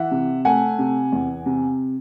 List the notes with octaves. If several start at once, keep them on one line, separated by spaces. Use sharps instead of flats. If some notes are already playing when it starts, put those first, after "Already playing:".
Already playing: E3 E5 F#5
C3
A3 F#5 G#5
C3
E2
C3